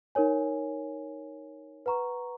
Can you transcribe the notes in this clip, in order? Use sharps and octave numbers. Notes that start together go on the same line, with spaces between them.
D#4 A#4 C#5 G#5
B4 F#5 A#5 C#6